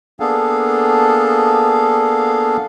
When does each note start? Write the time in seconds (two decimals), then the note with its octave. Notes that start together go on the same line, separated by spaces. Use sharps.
0.20 A#3 B3 D4 G#4 A4 F5